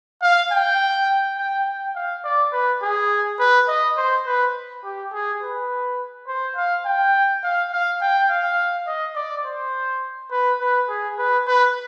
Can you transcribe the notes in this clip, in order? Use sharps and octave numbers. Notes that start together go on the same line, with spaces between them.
F5
G5
G5
G5
F5
D5
B4
G#4
B4
D#5
C5
B4
G4
G#4
B4
C5
F5
G5
F5
F5
G5
F5
D#5
D5
C5
B4
B4
G#4
B4
B4